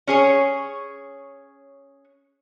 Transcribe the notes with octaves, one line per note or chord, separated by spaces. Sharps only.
C#4 G#4 C#5